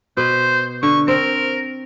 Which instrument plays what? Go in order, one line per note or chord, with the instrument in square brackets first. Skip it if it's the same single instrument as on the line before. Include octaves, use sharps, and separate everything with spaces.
[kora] B2 B4 [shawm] C5
[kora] D3 [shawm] C#6
[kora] C4 [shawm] A#4